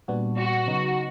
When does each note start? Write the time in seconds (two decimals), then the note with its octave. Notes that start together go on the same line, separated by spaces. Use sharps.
0.08 A#2 G3 B3 D4 F#4
0.38 F#4
0.67 C#3 F#3 B3 D#4